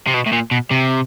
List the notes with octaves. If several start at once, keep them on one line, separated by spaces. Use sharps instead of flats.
C3
B2
A2
A#2
B2
C3